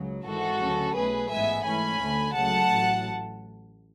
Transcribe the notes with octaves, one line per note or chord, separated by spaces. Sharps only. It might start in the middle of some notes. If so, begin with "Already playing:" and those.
Already playing: C#2 C#3 F#3
G#1 G#2 E3 G#3 F#4 A4
D2 C#3 F#3 C#4
B1 B2 A3 G#4 B4
A1 G#2 G#3 B3 E5 G#5
G#2 E3 A3 C#4 G#5 B5
D2 D3 A3
C#2 C#3 F#3 A3 F#5 A5
A1 A2 F#3